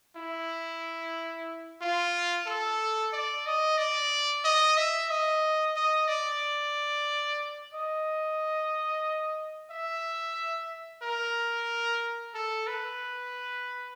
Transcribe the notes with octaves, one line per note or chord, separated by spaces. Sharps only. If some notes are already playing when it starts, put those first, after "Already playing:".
E4
F4
A4
D5
D#5
D5
D#5
E5
D#5
D#5
D5
D#5
E5
A#4
A4
B4